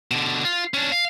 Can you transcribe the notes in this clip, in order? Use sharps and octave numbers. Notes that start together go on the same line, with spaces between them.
B2 D3
F4
C#4 D4
F5